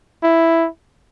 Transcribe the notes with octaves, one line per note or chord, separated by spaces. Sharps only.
E4